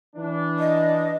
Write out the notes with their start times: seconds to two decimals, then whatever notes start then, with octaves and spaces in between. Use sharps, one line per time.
0.16 E3 D4
0.59 D#5